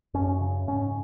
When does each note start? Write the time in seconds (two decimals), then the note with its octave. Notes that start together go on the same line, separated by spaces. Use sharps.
0.14 F#2 C#4
0.40 C#3
0.68 G#2 C#4